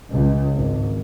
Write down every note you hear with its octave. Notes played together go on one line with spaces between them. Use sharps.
C#2
G#1